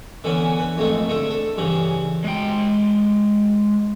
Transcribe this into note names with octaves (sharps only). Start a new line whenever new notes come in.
D3 E3 B3 C#4
B4
F2 G#2 A3
D3 A3 A4
A4
G2 C#3 E3
G#3 G5